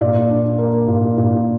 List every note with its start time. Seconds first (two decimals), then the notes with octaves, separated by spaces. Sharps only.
0.01 A#2 D5
0.29 D4
0.58 A#3
0.88 A#2
1.17 A#2